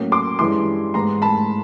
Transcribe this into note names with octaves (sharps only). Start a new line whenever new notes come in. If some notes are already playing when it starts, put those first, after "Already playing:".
Already playing: A2 F#3 A#3 C#4
C6 D6
G2 E3 G#3 C#4 E4 C6 D6
G#2 E3 G#3 B3 A#5 C6
A5 B5